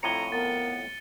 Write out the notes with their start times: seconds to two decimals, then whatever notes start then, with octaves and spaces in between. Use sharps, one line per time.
0.03 F2 A2 C#5 A#5 C#7 D#7 G7
0.32 B3 A#4 A6